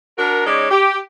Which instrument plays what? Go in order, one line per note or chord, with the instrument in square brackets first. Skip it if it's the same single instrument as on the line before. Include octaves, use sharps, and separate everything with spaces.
[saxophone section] D4 F#4 A#4
G#3 C#4 D#4 C#5 D5
G4